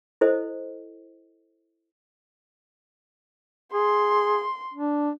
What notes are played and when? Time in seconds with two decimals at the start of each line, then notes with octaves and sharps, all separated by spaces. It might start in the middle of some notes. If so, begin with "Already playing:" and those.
0.21 E4 A4 C5 D#5
3.73 G#4 C6
4.74 D4